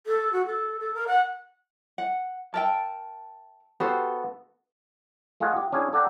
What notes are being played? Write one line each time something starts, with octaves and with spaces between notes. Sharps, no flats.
A4
F#4
A4
A4
A#4
F#5
F#5
A#4 E5 G5 A5
B3 F#4 G4 A4 C5
A3 F4 G#4 D#5 F#5
G4
C#4 D4 E4 G#4
A4 D5 F#5 G5 A#5